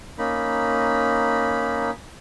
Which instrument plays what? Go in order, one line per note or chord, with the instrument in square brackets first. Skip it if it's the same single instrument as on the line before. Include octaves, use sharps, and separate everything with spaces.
[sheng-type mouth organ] A#3 C#4 D#4 B5